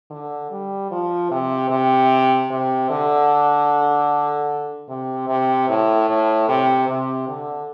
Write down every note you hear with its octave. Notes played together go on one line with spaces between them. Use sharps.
D3
G3
F3
C3
C3
C3
D3
C3
C3
A2
A2
C3
C3
D3